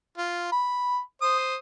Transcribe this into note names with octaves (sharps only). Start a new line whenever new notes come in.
F4
B5
C5 D#6